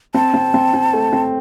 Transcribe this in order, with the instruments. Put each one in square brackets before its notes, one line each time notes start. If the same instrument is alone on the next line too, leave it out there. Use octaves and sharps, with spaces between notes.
[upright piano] C4 [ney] A5
[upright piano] C4
C4
C4
A3
C4